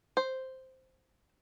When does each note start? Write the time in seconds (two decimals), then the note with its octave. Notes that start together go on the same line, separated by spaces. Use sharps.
0.17 C5